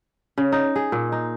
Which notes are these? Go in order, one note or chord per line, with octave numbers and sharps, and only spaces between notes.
C#3
D#4
G#4
A#2
D#4